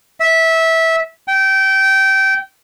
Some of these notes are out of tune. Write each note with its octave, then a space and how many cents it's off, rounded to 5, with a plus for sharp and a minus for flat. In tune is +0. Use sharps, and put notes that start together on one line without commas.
E5 -15
G5 -20